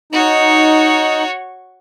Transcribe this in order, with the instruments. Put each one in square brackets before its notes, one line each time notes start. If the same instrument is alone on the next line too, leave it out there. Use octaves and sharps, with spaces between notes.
[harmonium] D#4 [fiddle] F#4 C#5